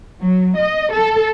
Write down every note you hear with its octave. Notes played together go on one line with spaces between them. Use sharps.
F#3
D#5
A4